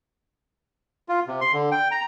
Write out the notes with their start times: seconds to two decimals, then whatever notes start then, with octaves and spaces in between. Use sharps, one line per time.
1.09 F4
1.27 C3
1.41 C6
1.53 D3
1.72 G5
1.91 A#5